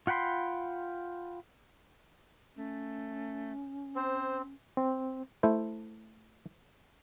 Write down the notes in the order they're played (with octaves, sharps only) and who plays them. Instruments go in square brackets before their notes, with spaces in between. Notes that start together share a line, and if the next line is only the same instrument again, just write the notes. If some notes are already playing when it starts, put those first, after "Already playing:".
[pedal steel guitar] F4 F#5 G5 B5 C6
[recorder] A3 [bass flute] C#4
[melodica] C4 [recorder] C5
[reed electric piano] C4
[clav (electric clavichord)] A3 E4 C5